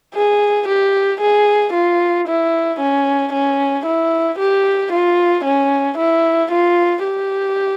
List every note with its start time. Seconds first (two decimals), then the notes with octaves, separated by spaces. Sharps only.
0.15 G#4
0.68 G4
1.21 G#4
1.73 F4
2.27 E4
2.80 C#4
3.33 C#4
3.86 E4
4.39 G4
4.92 F4
5.45 C#4
5.98 E4
6.51 F4
7.04 G4